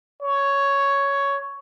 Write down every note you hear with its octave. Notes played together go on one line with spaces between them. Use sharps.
C#5